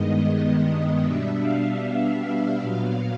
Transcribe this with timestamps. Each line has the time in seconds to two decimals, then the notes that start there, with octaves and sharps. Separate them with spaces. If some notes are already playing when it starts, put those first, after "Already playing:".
Already playing: G2 D#3 G#3 B3 D#5
1.01 B2 G3 B3 D4 E5
1.41 F5
2.60 A#2 F#3 B3